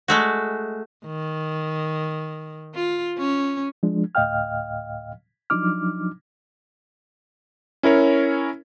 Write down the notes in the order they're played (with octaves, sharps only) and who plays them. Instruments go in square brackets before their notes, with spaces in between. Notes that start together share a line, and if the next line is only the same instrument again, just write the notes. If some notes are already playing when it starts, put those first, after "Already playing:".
[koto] G#3 A3 F#4
[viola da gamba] D#3
F4
C#4
[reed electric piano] F3 G#3 D4
D2 A2 D#5 F5 G5 F6
F3 F#3 D4 D#4 D6 F6
[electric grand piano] C#4 E4 A#4 C#5